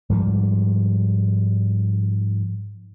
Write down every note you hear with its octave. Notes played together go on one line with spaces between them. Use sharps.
G#2 F3 G3